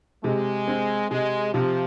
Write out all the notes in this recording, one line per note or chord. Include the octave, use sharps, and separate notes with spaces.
C3 G#3
C4
C3 G#3
C3 F3